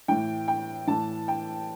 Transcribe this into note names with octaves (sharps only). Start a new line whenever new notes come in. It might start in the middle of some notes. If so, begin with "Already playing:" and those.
A2 E3 G5
G5
A2 E3 A5
G5